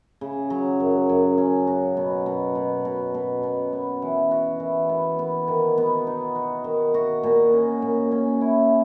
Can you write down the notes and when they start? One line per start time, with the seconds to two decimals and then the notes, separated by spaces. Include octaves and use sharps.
0.21 C#3
0.50 F#3
0.80 F#2
1.09 F#2
1.38 C#4
1.67 F#4
1.97 B2
2.26 B2
2.55 B2
2.85 B2
3.14 B2
3.43 B2
3.73 B3
4.02 E3
4.31 F#4
4.60 E3
4.89 B3
5.19 B3
5.48 D#3
5.78 B3
6.07 D#4
6.36 F#4
6.64 D#3
6.94 F#4
7.23 A#2
7.53 C#4
7.82 A#2
8.12 C#4
8.41 E4